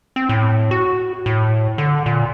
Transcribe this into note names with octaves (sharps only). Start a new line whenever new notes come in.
C4
A2
F#4
A2
D3
A#2